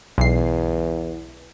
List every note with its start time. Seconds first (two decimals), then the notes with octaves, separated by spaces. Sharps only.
0.18 B1 E2 C7